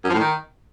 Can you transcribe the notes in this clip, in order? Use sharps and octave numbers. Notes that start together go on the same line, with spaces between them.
F#2
F3
A2
D#3